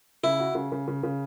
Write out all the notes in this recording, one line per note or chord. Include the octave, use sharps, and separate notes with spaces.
C#3 E4
F#4
C#3
C#3
C#3
C#3